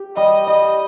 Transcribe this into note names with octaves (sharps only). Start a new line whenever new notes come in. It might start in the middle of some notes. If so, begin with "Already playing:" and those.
Already playing: G4
G3 D#5
G3 D#5